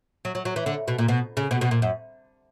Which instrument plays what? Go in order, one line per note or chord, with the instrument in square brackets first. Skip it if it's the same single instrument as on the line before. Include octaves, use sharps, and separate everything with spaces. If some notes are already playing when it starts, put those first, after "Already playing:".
[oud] F#3
F#3
F#3
E3
D3
B2
A#2
B2
C#3
B2
B2
A#2
F#2